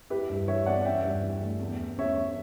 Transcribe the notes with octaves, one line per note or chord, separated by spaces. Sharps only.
E4 G4 B4
G2
E3 C#5 E5
B3 D5 F#5
C#4 E5 G5
G2
E3
A3
E2
E2
C#3 C#5 E5
E3